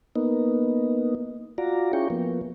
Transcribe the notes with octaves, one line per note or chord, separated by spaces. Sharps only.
A#3 B3 D#4
F4 F#4 D5 A#5
C#4 E4 F4 G#4 G5 C#6
F3 A#3 B3